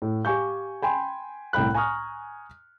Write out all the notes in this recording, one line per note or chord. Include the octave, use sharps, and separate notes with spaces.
A2
G4 F5 G#5 C#6 G6
G5 G#5 B5 C6
C2 A2 G5 B5 F#6
G#5 A#5 C#6 D#6 F6